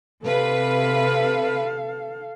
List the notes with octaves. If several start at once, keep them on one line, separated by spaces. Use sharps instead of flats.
C3 A4 B4 F5